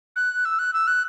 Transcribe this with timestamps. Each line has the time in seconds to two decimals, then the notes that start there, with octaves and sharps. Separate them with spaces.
0.16 F#6
0.45 E6
0.59 F#6
0.73 E6
0.87 F#6